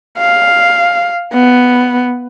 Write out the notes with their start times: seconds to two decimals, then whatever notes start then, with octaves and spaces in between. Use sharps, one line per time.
0.18 F5
1.33 B3